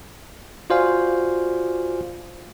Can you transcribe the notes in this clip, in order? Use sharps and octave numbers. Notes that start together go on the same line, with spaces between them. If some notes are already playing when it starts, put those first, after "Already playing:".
F4 F#4 C5 D5 F5 G#5